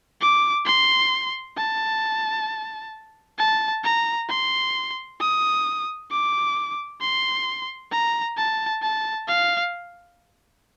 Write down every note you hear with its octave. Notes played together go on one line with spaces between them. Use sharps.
D6
C6
A5
A5
A#5
C6
D#6
D6
C6
A#5
A5
A5
F5